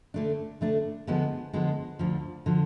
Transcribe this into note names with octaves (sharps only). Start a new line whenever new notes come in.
D3 A3 D4
D3 A3 D4
D3 F3 G#3 B3
D3 F3 G#3 B3
D2 D3 F3
D3 F3